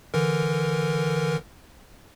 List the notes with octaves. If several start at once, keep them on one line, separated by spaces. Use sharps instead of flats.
D3 E3 A#4